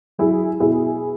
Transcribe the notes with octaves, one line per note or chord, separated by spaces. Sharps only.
F#3 E4 G#4
B2 E4 G#4